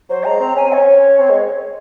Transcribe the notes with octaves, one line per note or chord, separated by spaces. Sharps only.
F#3 C5
G#3 A#5
C4
C#4 G#5
C4
C#5
C#4
C4
G#3